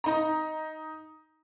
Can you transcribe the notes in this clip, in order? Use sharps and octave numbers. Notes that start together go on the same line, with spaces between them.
D#4 A#5